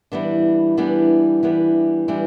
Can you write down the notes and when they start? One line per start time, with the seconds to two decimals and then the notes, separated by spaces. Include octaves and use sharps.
0.12 E3 G3 B3 D4
0.77 E3 G3 B3 D4
1.43 E3 G3 B3 D4
2.08 E3 G3 B3 D4